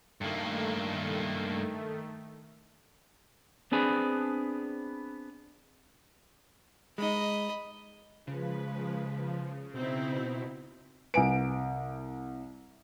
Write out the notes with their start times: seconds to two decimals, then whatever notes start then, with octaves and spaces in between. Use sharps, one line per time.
0.21 G2 D#3 A3 A#3
3.71 B3 C4 D4 G#4 B4
6.98 G#3 D#4 D#5 B5
8.27 C#3 F3 G#3 B4
9.74 B2 C4 D#4 E4
11.14 C2 B4 G#5 D7